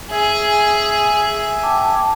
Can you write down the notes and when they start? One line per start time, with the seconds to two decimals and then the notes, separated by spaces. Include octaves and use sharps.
0.11 G#4 E5 G#5
1.63 G5 A5 D6